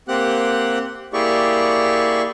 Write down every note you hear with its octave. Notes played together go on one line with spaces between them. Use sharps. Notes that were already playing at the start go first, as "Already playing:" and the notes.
A#3 C4 G4 F#5 F#6
A#3 E4 G4 G#4 D5 C#6